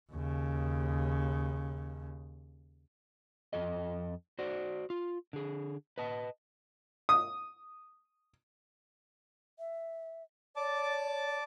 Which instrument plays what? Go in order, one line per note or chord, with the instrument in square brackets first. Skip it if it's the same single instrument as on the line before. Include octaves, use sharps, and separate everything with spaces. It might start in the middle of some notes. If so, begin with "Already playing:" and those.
[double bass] D#2 C#3
[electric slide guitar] F2 A4 D#5
F#4 C5 D5
F4
D3 G#4
B4 D#5 A5
[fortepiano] D#6
[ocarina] E5
[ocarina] C#5 [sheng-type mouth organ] D5 A5 D6